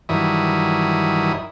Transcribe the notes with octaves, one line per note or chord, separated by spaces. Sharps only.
G2 D#3 E3 F#3 E4 D#6